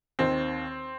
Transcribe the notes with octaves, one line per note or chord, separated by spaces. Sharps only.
D#2 D#3 C4